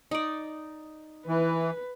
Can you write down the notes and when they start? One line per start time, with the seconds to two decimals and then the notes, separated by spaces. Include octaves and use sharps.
0.11 D#4 D5
1.27 E3 B4